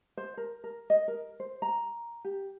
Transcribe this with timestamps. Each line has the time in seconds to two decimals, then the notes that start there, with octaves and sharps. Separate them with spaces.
0.17 C5
0.37 A#4
0.64 A#4
0.90 D#5
1.08 A#4
1.40 C5
1.62 A#5
2.25 G4